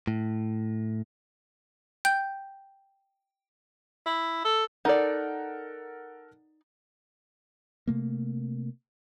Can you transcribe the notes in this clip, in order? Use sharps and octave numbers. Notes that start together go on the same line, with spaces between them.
A2
G5 G6
E4
A4
D#4 A4 A#4 D5 F#5
C3 A3 A#3